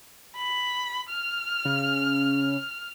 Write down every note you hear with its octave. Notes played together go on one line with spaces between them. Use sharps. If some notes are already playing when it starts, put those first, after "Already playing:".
B5
F6
C#3